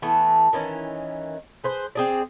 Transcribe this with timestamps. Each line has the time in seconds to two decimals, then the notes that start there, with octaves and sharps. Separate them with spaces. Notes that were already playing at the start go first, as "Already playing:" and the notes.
0.02 E3 A3 B3
0.53 D#3 E3 C#4
1.64 G#4 B4 C5
1.95 C4 G#4 D5